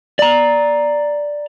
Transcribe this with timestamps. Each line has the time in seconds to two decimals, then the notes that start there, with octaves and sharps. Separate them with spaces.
0.19 D5 A#5